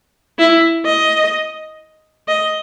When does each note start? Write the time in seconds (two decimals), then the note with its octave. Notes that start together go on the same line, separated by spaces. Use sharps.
0.39 E4
0.86 D#5
2.28 D#5